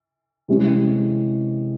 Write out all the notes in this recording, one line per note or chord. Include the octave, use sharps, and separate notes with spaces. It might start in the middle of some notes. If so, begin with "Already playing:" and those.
C3 E3 G#3 C#4